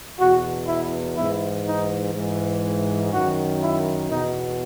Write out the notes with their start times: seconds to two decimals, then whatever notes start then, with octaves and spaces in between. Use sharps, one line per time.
0.19 E2 B2 F#4
0.67 E4
1.16 G#2 E3 E4
1.66 D#4
2.15 G#2 E3
3.12 F#2 D#3 F#4
3.61 E4
4.09 E2 B2 D#4